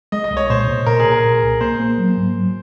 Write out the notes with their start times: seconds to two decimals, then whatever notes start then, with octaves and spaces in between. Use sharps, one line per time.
0.12 G#3 D#5
0.24 D#5
0.31 C2
0.37 C#5
0.50 A#2 C5
0.68 A#2
0.86 A#2 A#4
1.00 G#4
1.05 A#2
1.12 A#4
1.24 A#2
1.42 C2
1.61 A#3 C5
1.80 A#3
1.98 F#3
2.17 G#2
2.35 F#3